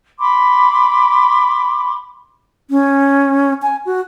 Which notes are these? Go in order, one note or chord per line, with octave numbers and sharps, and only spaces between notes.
B5 C6 D6
C#4
G#5
F#4